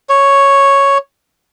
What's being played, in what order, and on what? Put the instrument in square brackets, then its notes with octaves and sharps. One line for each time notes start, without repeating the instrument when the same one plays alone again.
[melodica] C#5